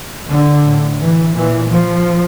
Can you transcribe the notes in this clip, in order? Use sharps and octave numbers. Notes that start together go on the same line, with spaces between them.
D3
A2
E3
A#2 E3
F3